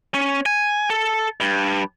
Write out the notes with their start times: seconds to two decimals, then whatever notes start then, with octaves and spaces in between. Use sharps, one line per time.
0.14 C#4
0.46 G#5
0.90 A4
1.40 G2